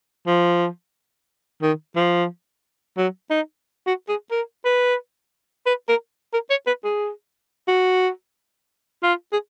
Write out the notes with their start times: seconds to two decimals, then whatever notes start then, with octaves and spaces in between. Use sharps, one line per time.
0.27 F3
1.62 D#3
1.96 F3
2.97 F#3
3.30 D#4
3.87 F#4
4.09 G#4
4.31 A#4
4.65 B4
5.67 B4
5.89 A#4
6.34 A#4
6.50 C#5
6.67 B4
6.84 G#4
7.68 F#4
9.03 F4
9.33 G#4